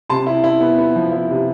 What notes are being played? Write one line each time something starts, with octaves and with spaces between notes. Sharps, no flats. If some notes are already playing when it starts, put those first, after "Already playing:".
C3 A5 C6
E4
E4
B3
B3
F3
E4
C3